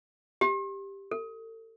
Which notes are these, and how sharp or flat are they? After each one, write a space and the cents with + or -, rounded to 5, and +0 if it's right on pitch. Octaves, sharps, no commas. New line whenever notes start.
G4 +5
A4 +40